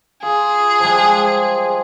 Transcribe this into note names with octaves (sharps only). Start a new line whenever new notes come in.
F4 G#4
F3 G3 G#3